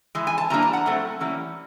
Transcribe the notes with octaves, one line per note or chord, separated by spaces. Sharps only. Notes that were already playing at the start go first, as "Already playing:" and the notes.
E3 G#3
G#5
A5
C3 E3 G3 A#3 D4 A#5
A5
F#5
A2 F#3 A3 C4
E3 G3 A#3 C#4